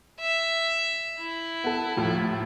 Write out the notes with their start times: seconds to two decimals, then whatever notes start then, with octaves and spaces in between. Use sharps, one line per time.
0.20 E5
1.19 E4
1.64 B3 A4
1.96 D#2 A2 F3